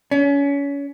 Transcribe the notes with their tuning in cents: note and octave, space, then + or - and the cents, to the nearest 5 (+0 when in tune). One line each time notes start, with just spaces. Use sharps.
C#4 +30